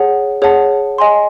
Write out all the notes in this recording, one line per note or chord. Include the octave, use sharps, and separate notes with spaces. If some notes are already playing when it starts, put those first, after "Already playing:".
Already playing: G#4 C#5 F#5 A5
G#4 C#5 F#5 A5
D#5 G#5 C6